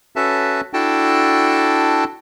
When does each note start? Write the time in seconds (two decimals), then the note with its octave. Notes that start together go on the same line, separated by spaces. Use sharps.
0.16 C#4 F#4 A4 B4 E5 A5
0.73 D4 E4 F#4 A4 G5 A5